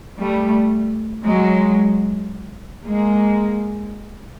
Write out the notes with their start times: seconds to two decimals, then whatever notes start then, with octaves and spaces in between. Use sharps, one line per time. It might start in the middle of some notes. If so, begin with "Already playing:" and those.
0.19 G3 A3
1.25 F#3 G#3
2.85 G#3 A#3